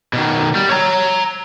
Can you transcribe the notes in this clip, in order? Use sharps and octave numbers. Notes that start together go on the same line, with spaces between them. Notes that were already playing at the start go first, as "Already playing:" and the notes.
B2 D#3
G3
C#5 A#5